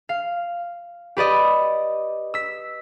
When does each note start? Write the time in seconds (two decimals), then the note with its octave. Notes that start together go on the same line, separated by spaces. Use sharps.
0.09 F5
1.17 G4 B4 D5 D#5
2.34 E6 B6